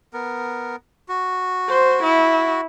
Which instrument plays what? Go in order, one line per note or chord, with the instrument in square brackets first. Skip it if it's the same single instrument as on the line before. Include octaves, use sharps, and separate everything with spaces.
[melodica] B3 A#4
F#4
[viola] C5
E4